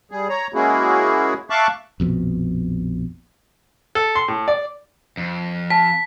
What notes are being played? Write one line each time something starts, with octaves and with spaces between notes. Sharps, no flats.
G3 G#4
C#5 A#5
G#3 A#3 C#4 E4 F#4 G#4
E5 F5 A5 C#6 D6 F#6
A#1 F2 B2
A4
C6
A2
D5
F2
A5 B6